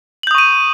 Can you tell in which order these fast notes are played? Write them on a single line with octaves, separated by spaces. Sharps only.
F#7 G6 D#6 C#6 D#7